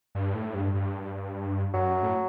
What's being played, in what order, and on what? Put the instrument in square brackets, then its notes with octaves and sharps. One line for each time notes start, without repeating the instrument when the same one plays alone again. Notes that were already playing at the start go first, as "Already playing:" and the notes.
[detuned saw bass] G2
A2
G2
G2
[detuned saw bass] F#2 [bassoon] F#3
[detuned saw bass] A2